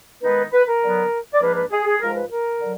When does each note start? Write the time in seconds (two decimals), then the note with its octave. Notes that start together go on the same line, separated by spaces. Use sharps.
0.23 D#3 G#3 B3 D#4 B4
0.53 B4
0.68 A#4
0.83 D3 F#3 B3
1.33 D5
1.42 G#2 F3 A#3 D4 B4
1.57 B4
1.72 G#4
1.86 G#4
2.01 G#2 F3 G#3 A#4
2.16 B4
2.31 A#4
2.61 D3 F#3